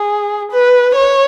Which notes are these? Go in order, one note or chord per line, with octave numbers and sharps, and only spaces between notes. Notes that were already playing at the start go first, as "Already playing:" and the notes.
Already playing: G#4
B4
C#5